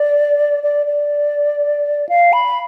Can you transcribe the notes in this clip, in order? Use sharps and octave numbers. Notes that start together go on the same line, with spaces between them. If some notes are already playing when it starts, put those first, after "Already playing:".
Already playing: D5
D5
D5
F5
B5